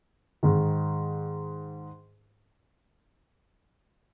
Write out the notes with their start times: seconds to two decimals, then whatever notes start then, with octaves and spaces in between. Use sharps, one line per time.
0.43 G#2 D#3